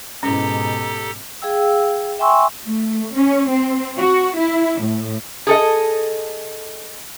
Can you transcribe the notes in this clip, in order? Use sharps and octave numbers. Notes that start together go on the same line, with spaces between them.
G#2 B2 C#4 E4 G4 A4 A#5
G#4 F5 G5 E6
E5 G5 G#5 C6 C#6 E6
A3
C#4
C4
F#4
E4
A2
G#4 A4 D#5